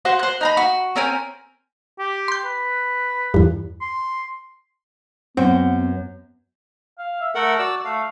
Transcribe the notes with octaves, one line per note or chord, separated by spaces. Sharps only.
F#4 C5 F#5 C6
C5 F#6
D#4 A#5 B5
F#4
C4 C#4 A#4 G#5
G4
C6 G6
B4
E2 G2
C6
F#2 B3 C4 F#4 G6
F5
E5
A3 A4 A#4 F#5
F#4 D5 E6
A3 F5